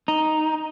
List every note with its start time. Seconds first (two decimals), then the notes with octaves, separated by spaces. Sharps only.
0.08 D#4